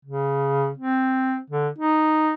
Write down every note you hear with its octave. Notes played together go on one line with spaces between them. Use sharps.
C#3
C4
D3
D#4